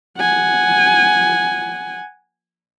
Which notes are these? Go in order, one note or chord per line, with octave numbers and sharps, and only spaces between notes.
F#5 G#5